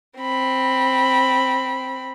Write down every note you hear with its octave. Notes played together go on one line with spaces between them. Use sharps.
C4 B5